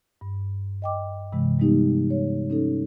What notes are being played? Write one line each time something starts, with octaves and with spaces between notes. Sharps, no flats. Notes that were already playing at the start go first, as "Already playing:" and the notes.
G2
D#5 G5 D6
G2 C3 E3 G#3
G3 G#3 B3 D#4 G4
C#5
C#4 D#4 A4